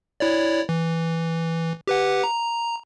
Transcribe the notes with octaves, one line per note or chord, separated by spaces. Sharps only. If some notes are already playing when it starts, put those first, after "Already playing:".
E4 C#5 D5
E3
G4 B4 F#5
A#5